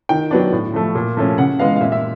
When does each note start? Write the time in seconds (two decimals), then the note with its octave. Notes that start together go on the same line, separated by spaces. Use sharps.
0.09 D#3 G5
0.31 F#3 B3 D4
0.53 A2
0.74 F3 A3
0.95 A#2
1.17 F3 A3 C#4
1.38 C#3 F#5
1.59 E3 G#3 B3 F5
1.76 F5
1.81 A#2 E5
1.92 E5